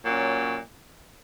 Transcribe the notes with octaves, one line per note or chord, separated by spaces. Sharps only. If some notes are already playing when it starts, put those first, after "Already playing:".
A#2 F#3 C#4